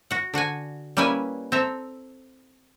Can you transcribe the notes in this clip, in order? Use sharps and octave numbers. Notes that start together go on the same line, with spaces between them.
F#4 F#5
D3 F#4 F#5 G#5
G3 A#3 C#4 E4 B4 G#5
C4 A4 E5 A#5